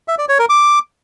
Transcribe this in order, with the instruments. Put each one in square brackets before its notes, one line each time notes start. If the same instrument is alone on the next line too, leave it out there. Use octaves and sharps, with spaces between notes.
[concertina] E5
D5
C#5
A#4
D6